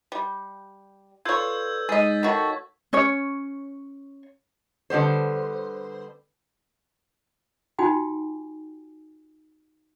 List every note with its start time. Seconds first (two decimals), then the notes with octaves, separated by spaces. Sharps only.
0.12 G3
1.25 F4 A4 B4 C#5 D5 E6 G6 G#6
1.89 G#3 D#4 G#4 C#5 D#5 A6 B6
2.23 D#3 F#4 A4 C#5 A5
2.93 C#4 C#5
4.90 D3 G3 B3 C5
7.79 D#4 F4 F#4 G5 G#5